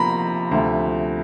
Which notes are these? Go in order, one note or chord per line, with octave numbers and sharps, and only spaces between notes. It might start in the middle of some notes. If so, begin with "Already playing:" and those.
Already playing: C3 F3 A#3 A#5 B5
D2 C3 F3 A3